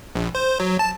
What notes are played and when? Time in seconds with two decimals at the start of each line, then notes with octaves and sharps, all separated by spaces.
0.15 A#1
0.35 C5
0.60 F#3
0.79 A5